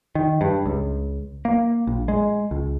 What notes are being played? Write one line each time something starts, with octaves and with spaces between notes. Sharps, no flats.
D#3
G2
C#2
A#3
A#1
G#3
C#2